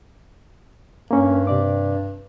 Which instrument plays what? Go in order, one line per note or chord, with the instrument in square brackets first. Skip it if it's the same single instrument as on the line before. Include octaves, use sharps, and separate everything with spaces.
[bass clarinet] G2 [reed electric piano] A#3 C#4
[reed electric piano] C3 D5 D6